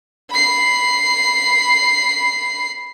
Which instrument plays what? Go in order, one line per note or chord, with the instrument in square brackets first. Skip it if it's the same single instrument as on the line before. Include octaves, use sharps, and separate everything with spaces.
[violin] B5 C7